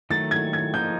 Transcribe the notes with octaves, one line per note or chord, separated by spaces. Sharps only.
D#3 F#3 A3 A6
G#6
G#6
F3 A#3 D#4 G6